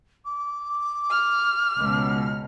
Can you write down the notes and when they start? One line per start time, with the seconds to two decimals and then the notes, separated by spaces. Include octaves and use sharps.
0.25 D6
1.10 F6
1.77 C#2 B2